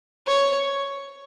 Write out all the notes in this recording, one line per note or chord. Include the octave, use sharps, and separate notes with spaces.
C#5